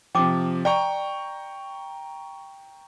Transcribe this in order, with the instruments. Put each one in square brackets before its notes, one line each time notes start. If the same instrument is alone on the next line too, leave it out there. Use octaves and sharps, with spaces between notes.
[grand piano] C3 F3 [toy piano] G5 D6
[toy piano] D5 [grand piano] G5 A#5 C#6